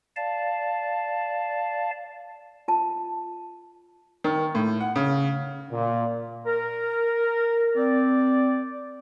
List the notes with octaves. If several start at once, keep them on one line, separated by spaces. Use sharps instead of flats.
D5 F5 A5
F4 A5
D#3
A2
F#5
C#3
A#2
A#4
C4 D5